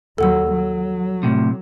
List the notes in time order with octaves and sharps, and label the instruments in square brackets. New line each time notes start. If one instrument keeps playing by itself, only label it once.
[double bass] D#2 F#3 [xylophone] A4 F#5 E6
[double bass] F#3
[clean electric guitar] A2 C3